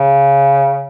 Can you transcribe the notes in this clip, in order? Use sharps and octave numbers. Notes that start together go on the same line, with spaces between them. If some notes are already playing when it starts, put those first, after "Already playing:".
Already playing: C#3